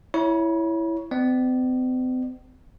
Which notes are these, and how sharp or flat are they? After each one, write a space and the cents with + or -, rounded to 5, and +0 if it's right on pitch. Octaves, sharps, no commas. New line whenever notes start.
E4 +5 C#5 +10 B5 -45
C4 -45 D5 +35